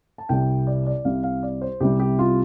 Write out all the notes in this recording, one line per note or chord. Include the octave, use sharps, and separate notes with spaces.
A5
C2 C3 G3 G5
D5
D5
C2 C3 G3 F5
F5
D5
C5
C2 C3 G3 G4
G4
F4